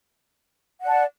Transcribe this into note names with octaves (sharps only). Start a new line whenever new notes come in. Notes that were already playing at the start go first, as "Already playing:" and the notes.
D5 F#5 A5